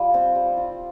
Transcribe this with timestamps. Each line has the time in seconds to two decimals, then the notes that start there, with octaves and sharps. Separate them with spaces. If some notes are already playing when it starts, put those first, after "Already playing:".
Already playing: G3 F4 G4
0.14 C4
0.35 G3
0.57 F4